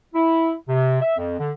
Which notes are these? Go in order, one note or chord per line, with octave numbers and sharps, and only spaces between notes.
E4
C3
E5
F2
D3